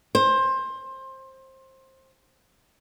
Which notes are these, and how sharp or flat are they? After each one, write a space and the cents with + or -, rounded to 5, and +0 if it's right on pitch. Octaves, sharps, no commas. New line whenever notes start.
C5 +20